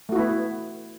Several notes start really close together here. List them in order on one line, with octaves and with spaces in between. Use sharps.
A3 F#4 E4 B3